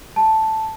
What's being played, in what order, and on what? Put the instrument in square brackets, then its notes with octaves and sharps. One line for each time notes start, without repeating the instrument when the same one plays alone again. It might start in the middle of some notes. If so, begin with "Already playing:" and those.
[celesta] A5